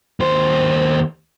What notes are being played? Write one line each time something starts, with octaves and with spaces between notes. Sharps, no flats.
D#2 C5